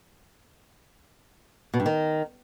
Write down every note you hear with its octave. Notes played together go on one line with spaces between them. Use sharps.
B2
G2
D#3